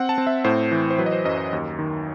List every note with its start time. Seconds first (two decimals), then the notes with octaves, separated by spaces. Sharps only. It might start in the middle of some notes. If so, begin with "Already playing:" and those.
Already playing: C4 F#5
0.09 A5
0.18 C4
0.27 E5
0.44 A2 C5
0.72 E3
0.90 C5
0.98 F#3 B4
1.06 D#5
1.13 C5
1.25 F#2 D#5
1.38 C5
1.53 D#2
1.79 D#3